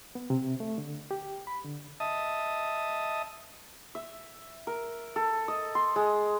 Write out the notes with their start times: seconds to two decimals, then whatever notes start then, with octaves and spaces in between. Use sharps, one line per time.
0.15 B3
0.30 C3
0.60 A3
0.78 D3
1.11 G4
1.47 B5
1.64 D3
2.00 D#5 E5 A5 D#6
3.95 E5
4.67 A#4
5.16 A4
5.48 D#5
5.75 C6
5.96 G#3